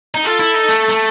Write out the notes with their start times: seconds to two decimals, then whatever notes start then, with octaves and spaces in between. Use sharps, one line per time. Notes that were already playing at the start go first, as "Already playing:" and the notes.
0.15 D#4
0.25 F4 A4
0.40 E4
0.54 D#4
0.69 A3
0.90 A3